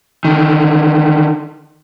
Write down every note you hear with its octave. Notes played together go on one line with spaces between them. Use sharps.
D3 D#3